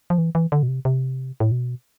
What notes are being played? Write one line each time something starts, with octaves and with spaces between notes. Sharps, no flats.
F3
E3
E3
D3
B2
C3
C3
A2
B2